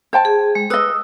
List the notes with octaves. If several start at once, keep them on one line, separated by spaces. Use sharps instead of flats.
C5 G5 A5
G#4
G#3
B4 D#5 D#6 E6